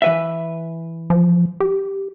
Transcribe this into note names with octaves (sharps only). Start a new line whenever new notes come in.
E3 B4 E5
F3
G4